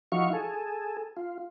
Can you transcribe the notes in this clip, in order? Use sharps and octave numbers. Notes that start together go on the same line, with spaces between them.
F3 D#4 E4 F#4 F5 C#6
G#4 A4
F4